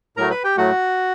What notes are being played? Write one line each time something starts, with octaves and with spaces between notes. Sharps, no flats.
A2 F#3 A3 A#4 A#5
B4 B5
G4 G5
A2 F#3 A3 F#4 F#5